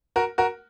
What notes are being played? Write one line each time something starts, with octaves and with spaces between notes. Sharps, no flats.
F#4 A#4
F#4 A#4